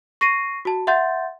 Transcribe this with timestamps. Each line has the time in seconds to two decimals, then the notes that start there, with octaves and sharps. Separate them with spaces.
0.21 C#6 A#6 C7 D#7
0.65 F#4 A5
0.87 E5 F#5 C6 G6 A6